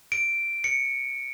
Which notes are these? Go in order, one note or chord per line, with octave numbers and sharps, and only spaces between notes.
D7
C#7